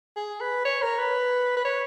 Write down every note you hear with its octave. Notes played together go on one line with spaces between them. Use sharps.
G#4
B4
C#5
A#4
B4
B4
C#5